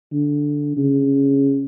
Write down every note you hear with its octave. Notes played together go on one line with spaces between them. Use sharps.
D3
C#3